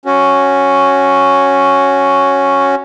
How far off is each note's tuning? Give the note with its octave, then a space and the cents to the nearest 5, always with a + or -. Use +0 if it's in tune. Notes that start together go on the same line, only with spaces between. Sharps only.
C#4 +0 F#4 +0